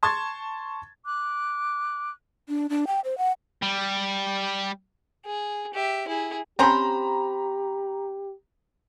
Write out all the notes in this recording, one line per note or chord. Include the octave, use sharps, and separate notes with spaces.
A5 C6 C#6 G#6 A6
D6 F#6
D4
D4
G5
C5
F#5
G3
G#4
G4 E5
E4 G#4
C4 C#4 G4 C5 A#5 B5